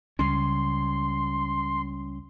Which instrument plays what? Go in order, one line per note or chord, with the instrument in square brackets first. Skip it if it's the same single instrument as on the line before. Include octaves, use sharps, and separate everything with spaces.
[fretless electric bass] C#2 [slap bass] G3 C#4 [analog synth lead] C6